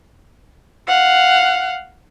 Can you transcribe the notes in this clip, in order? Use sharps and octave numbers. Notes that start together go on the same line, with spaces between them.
F5 F#5